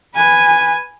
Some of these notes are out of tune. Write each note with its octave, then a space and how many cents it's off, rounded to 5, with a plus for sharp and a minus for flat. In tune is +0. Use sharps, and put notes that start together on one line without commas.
B4 +0 G#5 -10